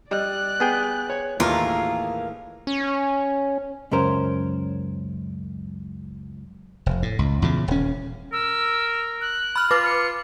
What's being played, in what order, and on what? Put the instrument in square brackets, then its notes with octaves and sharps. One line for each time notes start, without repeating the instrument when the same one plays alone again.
[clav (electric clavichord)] G3 [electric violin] D5 F#6 [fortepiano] D#5
[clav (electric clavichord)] B3 G#4 G5
[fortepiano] C#5
[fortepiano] D#2 [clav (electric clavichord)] A2 E3 [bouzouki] F4 A#4 [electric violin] G#4
[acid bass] C#4
[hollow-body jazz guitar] C#2 F#2 C#4 A#4 C5
[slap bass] F1
A2
C#2
E2 A#2 C#3
D#1 C#4
[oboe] A#4 [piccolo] E6
[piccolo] F#6
[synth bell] B5 F6
[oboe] F4 [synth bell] B4 D6
[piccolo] C#7